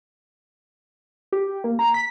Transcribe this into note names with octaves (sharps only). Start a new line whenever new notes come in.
G4
A#3
A#5
B6